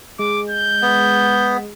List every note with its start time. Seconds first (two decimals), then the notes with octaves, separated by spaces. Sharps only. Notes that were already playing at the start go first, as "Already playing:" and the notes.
0.19 G#3 D6
0.50 G6
0.82 B3